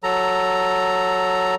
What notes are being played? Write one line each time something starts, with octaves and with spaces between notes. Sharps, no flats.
F#3 A4 A#5